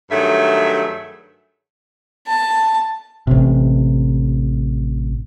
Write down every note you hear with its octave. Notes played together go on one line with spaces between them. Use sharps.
G2 D#3 F#3 A3 G#4 E5
A5
A1 C3